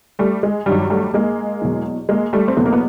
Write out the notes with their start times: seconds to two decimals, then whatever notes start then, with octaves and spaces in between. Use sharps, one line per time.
0.19 G3 A3
0.43 G#3
0.66 G2 D#3 F#3 G3
0.90 G3 A3
1.14 G#3 A#3
1.61 E2 B2 F#3
2.09 G#3 A#3
2.33 G3 A3
2.48 C4
2.56 E2 B2 F#3 A3 B3
2.66 A#3
2.73 B3